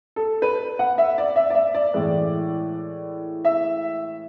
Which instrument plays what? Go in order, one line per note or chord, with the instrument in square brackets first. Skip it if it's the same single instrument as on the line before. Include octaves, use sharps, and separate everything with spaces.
[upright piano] A4
B4
F#5
E5
D5
E5
D5
E5
D5
A2 E3 G#3
E5